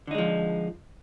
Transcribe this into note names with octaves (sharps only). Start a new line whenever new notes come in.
D3 F3 G#3 D#4